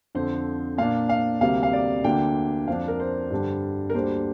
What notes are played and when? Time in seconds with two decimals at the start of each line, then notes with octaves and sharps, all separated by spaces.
0.15 F2 D3 F3 C5
0.78 A#2 A#3 D4 F5
1.09 F5
1.41 D2 C3 G3 A#3 F5
1.63 F5
1.73 D5
2.04 D2 D3 A#3 D4 G5
2.67 F2 F3 D4 F5
2.88 A#4
3.00 C5
3.31 G2 D3 G3 D4
3.90 A#4
3.94 D2 D3 G3 A#3 D4 C5